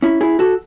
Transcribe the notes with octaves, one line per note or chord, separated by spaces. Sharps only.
C#4 E4
E4 G#4
F#4 A4